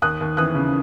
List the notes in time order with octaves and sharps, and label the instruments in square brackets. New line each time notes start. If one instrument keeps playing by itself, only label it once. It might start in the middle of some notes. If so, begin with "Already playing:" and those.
[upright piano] D#2 D#6 F#6
D#2
E3 D#6 F#6
C#3